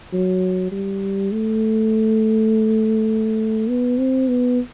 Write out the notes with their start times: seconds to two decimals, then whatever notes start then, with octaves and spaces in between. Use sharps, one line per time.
0.13 F#3
0.72 G3
1.32 A3
3.69 B3
3.99 C4
4.28 B3